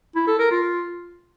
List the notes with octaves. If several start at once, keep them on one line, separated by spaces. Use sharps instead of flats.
E4
A4
A#4
F4